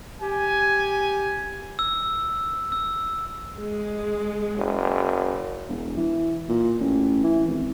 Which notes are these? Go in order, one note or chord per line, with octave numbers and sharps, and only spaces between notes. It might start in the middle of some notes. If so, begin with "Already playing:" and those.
G4 G#5
E6
E6
G#3
F#1
E1
E3
A#2
A1
E3
G#1